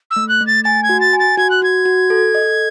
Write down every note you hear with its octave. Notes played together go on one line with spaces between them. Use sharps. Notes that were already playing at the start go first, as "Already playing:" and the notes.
E6
A3
F#6
A3
A6
G#5 A6
G#6
F#4
A6
G#5
A6
F#4 G#6
F#6
F#4 G#6
F#4
A4
D#5